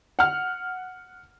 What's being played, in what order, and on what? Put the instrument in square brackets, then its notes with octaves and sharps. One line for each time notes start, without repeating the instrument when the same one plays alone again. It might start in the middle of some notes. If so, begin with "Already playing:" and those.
[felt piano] F#5 F6